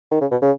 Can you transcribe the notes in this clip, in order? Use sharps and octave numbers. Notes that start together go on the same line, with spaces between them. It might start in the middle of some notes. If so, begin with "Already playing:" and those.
D#3
C#3
B2
C#3